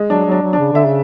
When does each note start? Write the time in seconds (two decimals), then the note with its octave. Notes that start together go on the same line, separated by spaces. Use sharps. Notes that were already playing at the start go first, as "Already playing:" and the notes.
Already playing: G#3
0.09 F#3 D4
0.26 F#3
0.32 D4
0.42 F#3
0.53 D4
0.58 C#3
0.72 D3 E5
0.86 C#3